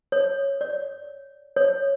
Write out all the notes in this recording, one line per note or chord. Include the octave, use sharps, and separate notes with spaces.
C#5
D5
C#5